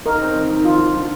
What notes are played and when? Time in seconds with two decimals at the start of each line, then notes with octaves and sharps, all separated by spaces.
0.06 D#4 A#4
0.21 C4
0.35 D#3
0.50 D#3
0.65 F3 F4
0.80 F3
0.94 D3